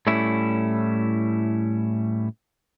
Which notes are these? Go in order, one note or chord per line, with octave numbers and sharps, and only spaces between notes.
A2 G3 A3 C#4 E4